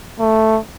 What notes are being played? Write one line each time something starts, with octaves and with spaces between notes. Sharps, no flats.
A3